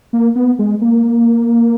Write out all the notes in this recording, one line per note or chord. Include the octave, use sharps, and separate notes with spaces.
A#3
B3
G#3
A#3